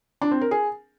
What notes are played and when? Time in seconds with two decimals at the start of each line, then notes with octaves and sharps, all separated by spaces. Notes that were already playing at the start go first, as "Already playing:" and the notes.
0.22 D4
0.31 C4
0.41 A#4
0.51 G#4